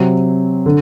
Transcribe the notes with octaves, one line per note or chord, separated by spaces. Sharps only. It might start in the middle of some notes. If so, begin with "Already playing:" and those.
Already playing: C3 F#3 C4
D3